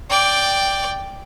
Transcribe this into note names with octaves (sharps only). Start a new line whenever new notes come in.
D5 G5